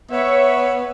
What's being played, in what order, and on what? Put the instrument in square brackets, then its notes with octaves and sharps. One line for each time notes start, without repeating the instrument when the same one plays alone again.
[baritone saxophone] B3 [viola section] C#5 E5